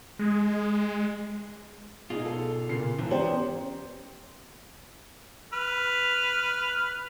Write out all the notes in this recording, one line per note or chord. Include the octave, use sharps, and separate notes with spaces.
G#3
B2 D#4 F4 G#4
A4
A#2 C#3 C7
G#1 E3
B3 C#4 G4 C5 D5 A#5
B4 F6